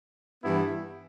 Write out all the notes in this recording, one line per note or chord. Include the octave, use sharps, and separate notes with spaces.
G2 E3 B3 E4